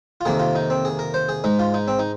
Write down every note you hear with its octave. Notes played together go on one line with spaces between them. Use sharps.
F4
F2 C3 D#3 A#3 G#4
F4
D#4
C4
G#4
A#4
C5
G#4
G#2 G#3 D#4
F4
D#4
C4
D#4